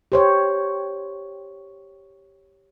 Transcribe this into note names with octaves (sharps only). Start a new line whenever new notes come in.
G4 C5 C#5